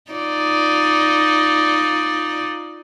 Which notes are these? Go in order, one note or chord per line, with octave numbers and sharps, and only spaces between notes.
D#4 F4 D5